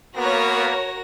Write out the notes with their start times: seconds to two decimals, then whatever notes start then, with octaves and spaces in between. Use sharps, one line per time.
0.17 A#3 B3 F#4 A#4 C#5 A#6